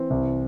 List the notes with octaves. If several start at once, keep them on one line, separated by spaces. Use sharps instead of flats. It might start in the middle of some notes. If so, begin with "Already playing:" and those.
Already playing: E3 C4
C2